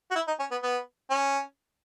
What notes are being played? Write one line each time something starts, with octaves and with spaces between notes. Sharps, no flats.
F#4
E4
D#4
C#4
B3
B3
C#4